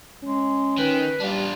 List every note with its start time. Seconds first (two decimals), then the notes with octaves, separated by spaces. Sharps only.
0.24 G#3 C#4
0.78 D#3 B4
1.20 G3 D4 F4